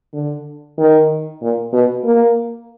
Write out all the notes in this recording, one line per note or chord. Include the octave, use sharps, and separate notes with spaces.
D3
D#3
A#2
B2
A#3